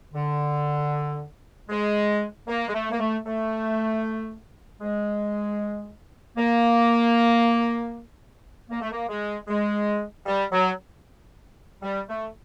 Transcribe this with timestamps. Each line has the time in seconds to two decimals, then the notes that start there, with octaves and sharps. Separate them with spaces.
0.13 D3
1.69 G#3
2.47 A#3
2.68 G#3
2.73 A3
2.91 A#3
2.99 A3
3.26 A3
4.81 G#3
6.37 A#3
8.70 A#3
8.81 A3
8.91 A#3
9.09 G#3
9.48 G#3
10.26 G3
10.52 F#3
11.82 G3
12.08 A3